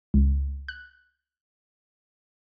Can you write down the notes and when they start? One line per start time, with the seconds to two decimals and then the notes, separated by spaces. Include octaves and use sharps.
0.14 C#2
0.68 F#6